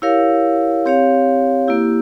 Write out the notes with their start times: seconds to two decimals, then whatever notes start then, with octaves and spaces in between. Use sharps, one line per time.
0.02 E4 G4 A#4 C#5 F5
0.86 C4 G4 C#5 F5
1.68 A#3 E4 G4